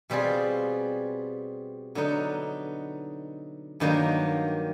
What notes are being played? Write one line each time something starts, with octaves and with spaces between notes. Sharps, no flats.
B2 G3 C4 F4 G#4
D3 F#3 B3 D#4
G2 D#3 F#3 A#3